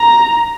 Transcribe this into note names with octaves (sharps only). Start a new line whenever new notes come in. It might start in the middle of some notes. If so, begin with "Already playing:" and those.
Already playing: A#5